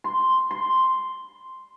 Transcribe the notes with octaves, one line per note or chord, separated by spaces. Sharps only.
C6
C6